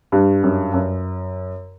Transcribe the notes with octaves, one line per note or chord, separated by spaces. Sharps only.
G2
F#2
F#2